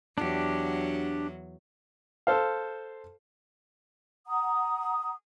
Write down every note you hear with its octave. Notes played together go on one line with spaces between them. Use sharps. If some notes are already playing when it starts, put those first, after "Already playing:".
E2 F#3 D4 G4
A4 C5 F5
F#5 A#5 D#6